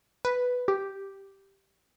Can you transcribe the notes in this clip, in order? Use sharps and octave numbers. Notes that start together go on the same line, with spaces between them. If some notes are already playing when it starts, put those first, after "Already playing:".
B4
G4